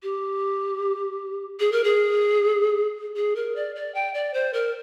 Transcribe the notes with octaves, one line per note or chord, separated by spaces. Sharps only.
G4
G#4
A#4
G#4
G#4
A#4
D5
D5
G5
D5
C5
A#4